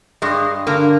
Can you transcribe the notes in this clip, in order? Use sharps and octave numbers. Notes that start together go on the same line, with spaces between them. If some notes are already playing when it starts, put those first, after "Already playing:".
G2 G#3
D3 A#3